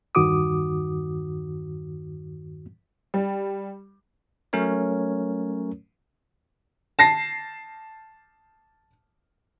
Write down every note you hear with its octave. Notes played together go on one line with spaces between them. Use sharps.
E2 G2 D#3 F#4 D6 D#6
G3
F#3 A3 C#4 A#4 C#5
A5 A#6 C7